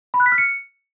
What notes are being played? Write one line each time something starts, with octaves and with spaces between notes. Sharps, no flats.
B5
F#6
B6
F6
C#7